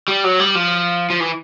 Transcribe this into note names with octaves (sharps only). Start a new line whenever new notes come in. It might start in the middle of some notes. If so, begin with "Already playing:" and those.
G3
F#3
G3
F3
F3
E3